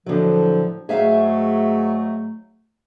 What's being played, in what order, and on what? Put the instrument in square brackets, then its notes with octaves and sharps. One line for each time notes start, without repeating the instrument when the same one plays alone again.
[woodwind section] A2 F3 [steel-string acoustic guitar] D3 F#3
[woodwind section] G#2 F#3 A3 [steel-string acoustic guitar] G#4 E5 F5